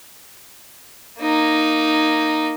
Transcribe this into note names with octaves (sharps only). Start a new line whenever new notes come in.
A#3 D#4